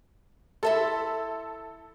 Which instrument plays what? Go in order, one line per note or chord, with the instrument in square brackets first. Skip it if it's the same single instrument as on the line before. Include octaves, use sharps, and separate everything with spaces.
[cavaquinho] E4 E5 C6 [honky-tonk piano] A4